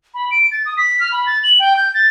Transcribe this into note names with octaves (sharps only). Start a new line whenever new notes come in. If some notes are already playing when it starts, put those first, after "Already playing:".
B5
D7
A6
D#6
B6
F6
B5
A6
F#7
G5
G6
A6